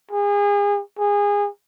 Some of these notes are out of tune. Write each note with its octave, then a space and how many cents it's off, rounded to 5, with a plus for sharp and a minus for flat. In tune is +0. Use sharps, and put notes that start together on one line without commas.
G#4 -35
G#4 -25